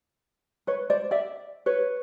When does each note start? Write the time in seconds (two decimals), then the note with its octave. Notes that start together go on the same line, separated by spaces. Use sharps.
0.67 B4 C#5
0.90 C5 D5
1.11 D5 E5
1.66 B4 C#5